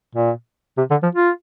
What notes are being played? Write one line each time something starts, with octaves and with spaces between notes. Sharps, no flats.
A#2
C3
D3
F3
F4